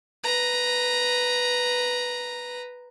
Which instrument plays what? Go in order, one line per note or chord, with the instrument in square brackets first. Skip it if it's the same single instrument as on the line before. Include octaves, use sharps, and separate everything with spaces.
[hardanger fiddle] B4 A#5